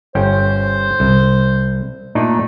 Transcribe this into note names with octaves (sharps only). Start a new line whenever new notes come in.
G1 C#4 C5 G5
C2
A#2 A3 D4 D#4